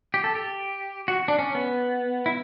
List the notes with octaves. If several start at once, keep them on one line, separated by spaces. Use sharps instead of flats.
G4
A4
G4
F#4
D4
C#4
B3
E4